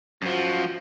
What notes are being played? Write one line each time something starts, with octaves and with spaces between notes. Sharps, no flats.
F#2 F3 F#4